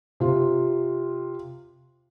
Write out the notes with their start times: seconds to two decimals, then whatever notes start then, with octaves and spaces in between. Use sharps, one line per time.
0.20 C3 F4